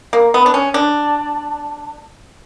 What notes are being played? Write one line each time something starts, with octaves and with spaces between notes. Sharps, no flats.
A#3
B3
D4
C#4
D4